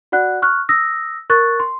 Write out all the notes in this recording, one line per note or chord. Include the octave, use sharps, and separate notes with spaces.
F#4 D5 F#5 F#6
C#6 F6 F#6
D#6 E6 A#6
A#4 C#6 F#6 A6
C6